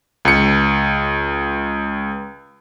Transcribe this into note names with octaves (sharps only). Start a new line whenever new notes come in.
C#2 C#7